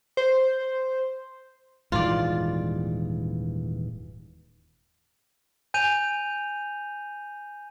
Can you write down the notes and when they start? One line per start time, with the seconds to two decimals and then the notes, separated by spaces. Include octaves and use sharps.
0.17 C5
1.92 D#1 G#2 E3 F4 D5
5.74 G#5 G6 D#7 F7